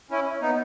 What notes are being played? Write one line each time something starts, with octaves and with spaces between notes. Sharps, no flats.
C#4 E4
B3 D#4